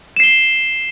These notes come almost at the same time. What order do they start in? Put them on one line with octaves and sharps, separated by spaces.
E7 C7 G7